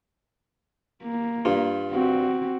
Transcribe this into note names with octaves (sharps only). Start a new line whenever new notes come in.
A#3
G2 F4
C4 F#4